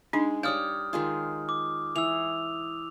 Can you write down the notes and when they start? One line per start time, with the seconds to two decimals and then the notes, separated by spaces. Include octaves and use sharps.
0.13 G#3 D4 D#4
0.43 G3 C#5 D5 F5 D#6 F6 G6
0.93 D#3 G#3 F4
1.49 D6
1.96 E3 E6 F7